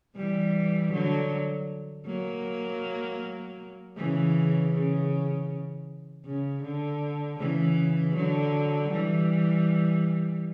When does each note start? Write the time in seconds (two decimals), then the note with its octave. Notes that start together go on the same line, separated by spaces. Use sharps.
0.16 E3 G3
0.92 D3 F#3
2.06 F#3 A#3
3.97 C#3 E3
4.73 C#3
6.25 C#3
6.63 D3
7.39 C#3 E3
8.16 D3 F#3
8.92 E3 G3